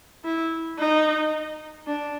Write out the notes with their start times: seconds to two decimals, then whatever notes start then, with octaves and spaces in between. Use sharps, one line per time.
0.24 E4
0.79 D#4
1.87 D4